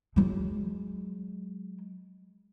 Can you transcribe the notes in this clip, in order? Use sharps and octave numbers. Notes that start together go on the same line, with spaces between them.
F#3 G#3